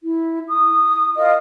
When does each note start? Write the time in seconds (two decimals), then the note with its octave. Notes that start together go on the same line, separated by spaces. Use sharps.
0.03 E4
0.47 D#6
1.15 F4 A#4 D#5